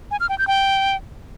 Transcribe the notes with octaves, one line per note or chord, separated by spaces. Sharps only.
G#5
F6
G5
G6
G5